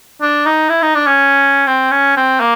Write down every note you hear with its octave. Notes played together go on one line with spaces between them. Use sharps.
D4
D#4
E4
D#4
D4
C#4
C4
C#4
C4
A#3